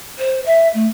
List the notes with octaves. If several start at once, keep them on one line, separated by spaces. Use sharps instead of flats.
C5
E5
A3